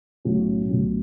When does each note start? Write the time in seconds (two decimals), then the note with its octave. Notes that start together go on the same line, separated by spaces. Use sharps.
0.25 B1 A2 F#3 C#4
0.69 B1 A2 F#3 C#4